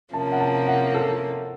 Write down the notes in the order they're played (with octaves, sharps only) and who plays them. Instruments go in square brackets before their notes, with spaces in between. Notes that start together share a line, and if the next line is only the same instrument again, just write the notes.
[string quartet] C3 F3 A#3 C#4 [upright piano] A5
[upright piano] F#5
A5
F#5
A4